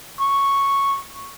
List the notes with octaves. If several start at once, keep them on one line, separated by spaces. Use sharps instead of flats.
C#6